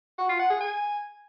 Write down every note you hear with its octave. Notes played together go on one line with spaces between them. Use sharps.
F#4
F4
F#5
G#4
G#5